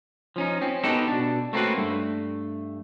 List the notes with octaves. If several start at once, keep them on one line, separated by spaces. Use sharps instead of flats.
F3 C#4 D#4
C4 C#4
B3 D#4 F#4 G4 A4
B2 D4
A3 A#3 C4 C#4 F#4 B4
G2 A3